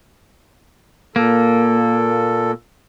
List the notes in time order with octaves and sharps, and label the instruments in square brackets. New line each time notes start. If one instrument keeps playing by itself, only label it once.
[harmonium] A#2 A4 [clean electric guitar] A#3